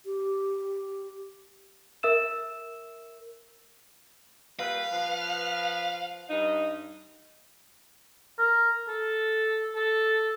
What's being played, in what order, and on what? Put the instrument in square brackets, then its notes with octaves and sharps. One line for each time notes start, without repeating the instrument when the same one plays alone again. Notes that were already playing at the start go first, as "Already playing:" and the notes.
[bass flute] G4
[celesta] A#4 E5 E6 E7
[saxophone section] A#2 G3 B4 [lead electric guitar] F5
[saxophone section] F3 B4
G2 D#4
[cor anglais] A#4
A4
A4